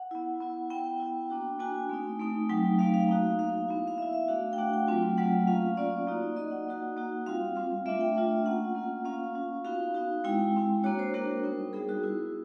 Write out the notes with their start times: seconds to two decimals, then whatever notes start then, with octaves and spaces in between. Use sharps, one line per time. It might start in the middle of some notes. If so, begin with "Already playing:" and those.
Already playing: F#5
0.11 B3 E4
0.41 B3 E4
0.70 B3 E4 G5
1.00 B3 E4
1.30 A#3 D4 F#4 G5
1.60 A#3 D4 F#4 G#5
1.89 A3 C4 D#4
2.20 A3 C4 D#4
2.49 F#3 A3 C4 D#4 G5
2.79 F#3 A3 C4 D#4 F5
2.94 F5
3.09 A#3 D#4 F#4
3.38 A#3 D#4 F#4 F5
3.68 B3 E4
3.88 F5
3.98 B3 E4 E5
4.13 E5
4.28 A3 D4 F#4 F5
4.53 G5
4.57 A3 D4 F#4 F#5
4.73 G5
4.88 F#3 A3 C4 F4
5.17 F#3 A3 C4 F4 F#5
5.47 A#3 C#4 F4 F5
5.77 A#3 C#4 F4 D5
6.07 A#3 D#4 F#4
6.36 A#3 D#4 F#4 D#5
6.51 F#5
6.67 A#3 D#4 F#4
6.97 A#3 D#4 F#4
7.26 G3 C4 F4 F5
7.56 G3 C4 F4
7.86 A3 D4 F4 E5
8.01 G5
8.16 A3 D4 F4
8.45 A#3 C#4 F4 F#5
8.75 A#3 C#4 F4
9.05 A#3 C#4 F4 F5
9.35 A#3 C#4 F4
9.65 B3 D#4 F#4 F5
9.95 B3 D#4 F#4
10.24 G#3 C4 E4 G5
10.54 G#3 C4 E4
10.84 A#3 D4 F#4 C#5
10.99 C5
11.14 A#3 D4 F#4 A#4
11.44 G3 B3 D#4
11.73 G3 B3 D#4 G#4
11.89 F#4
12.03 B3 E4